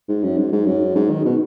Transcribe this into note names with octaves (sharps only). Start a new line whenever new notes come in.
G#2
F#2
G#2
G#2
F#2
G#2
D#3
B2